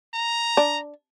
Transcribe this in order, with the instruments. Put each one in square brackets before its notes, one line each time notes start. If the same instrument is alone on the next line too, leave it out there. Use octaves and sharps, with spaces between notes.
[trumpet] A#5
[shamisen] D4